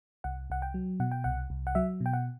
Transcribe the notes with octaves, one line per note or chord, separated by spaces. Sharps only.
C2 F#5
C2 F#5
G5
F#3
B2 F#5
G5
C2 F#5
C2
F#5
F#3 E5
B2
G5
F#5